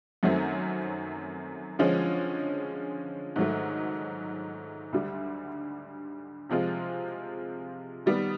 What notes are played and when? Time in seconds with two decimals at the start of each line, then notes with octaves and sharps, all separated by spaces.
0.23 F#2 D#3 F#3 A3 C4
1.79 D3 F3 G#3 C#4
3.36 G#2 D#3 F#3 A3
4.93 D2 D3 G3
6.49 C3 F3 G#3 C4 F4
8.06 D#3 G3 B3